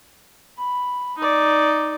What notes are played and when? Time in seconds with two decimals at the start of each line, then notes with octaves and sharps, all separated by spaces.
0.58 B5
1.18 D#4 D5